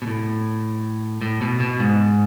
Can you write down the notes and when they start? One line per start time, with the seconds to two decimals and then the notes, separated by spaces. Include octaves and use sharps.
0.02 B2
0.07 A2
1.21 A2
1.41 B2
1.60 B2
1.80 G#2